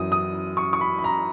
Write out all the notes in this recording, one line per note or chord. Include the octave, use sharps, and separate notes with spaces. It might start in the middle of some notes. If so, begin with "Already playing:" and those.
Already playing: F#2 E3 D#6
D#6
C#6
C#6
B5
B5
A#5